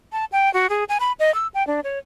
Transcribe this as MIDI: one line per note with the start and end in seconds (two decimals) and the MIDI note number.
0.12 0.25 81
0.32 0.52 79
0.54 0.69 66
0.69 0.84 68
0.89 0.98 80
1.00 1.12 83
1.20 1.33 75
1.34 1.47 88
1.54 1.66 79
1.67 1.80 62
1.84 1.99 73